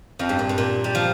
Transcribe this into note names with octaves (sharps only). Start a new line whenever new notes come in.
F2 F3
G2
A#2
G2
A#2
G3
F3